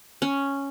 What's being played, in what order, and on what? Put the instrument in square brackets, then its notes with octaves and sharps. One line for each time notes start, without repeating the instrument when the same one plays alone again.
[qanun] C#4